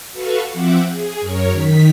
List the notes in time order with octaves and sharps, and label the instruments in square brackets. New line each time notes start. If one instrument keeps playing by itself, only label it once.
[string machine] F#4 A4 B4 F5 C#6
F3 C4 E5 F#5 D6
G#4
F#2 A#4 C#5
D#3 B6